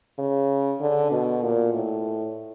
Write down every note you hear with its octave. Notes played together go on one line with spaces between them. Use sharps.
C#3
D3
B2
A#2
A2